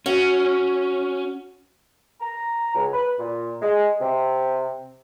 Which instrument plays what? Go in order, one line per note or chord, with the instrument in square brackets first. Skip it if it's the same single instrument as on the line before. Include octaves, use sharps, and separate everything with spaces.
[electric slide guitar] C#4 [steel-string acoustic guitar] F#4
[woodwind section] A#5
C#2
B4
A#2
G#3
C3